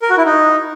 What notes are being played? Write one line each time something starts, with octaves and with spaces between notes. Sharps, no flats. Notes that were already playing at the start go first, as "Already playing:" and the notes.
A#4
F#4
E4
D#4